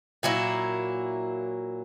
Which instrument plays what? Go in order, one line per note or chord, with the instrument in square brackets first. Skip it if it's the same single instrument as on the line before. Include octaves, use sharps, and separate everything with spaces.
[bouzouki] A#2 F#3 A#3 E4